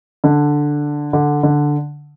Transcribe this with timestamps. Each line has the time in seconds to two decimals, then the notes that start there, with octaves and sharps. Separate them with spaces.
0.24 D3
1.13 D3
1.43 D3